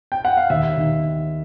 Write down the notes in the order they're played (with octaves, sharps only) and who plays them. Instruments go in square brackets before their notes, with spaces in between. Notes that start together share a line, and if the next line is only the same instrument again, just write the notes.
[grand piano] G5
F#5
F5
D#2 E5
D#3